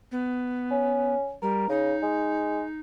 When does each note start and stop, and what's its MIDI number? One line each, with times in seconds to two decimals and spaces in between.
0.12 1.14 59
0.71 1.33 61
1.42 1.68 55
1.42 1.65 70
1.69 1.96 49
1.69 2.80 63
2.02 2.63 56